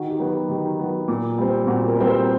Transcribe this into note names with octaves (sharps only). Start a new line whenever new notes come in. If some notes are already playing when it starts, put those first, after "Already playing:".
Already playing: D#3 F#4
G4
F#3 B3
D#3 G4
F#3 B3
A#2
G3 C4
A#2 F#4
A#4
G3 C4
C5